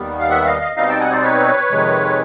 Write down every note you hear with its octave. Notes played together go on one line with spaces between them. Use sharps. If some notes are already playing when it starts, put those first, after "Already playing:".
Already playing: D#2 D#3 G3 B3
F5
E5 F#5
D#5 F5
D#5 F5
B2 G3 C4 D#4 D#5 F5
G5 A5
F#5 G#5
C5 D5
B4 C#5
F2 C3 D#3 G#3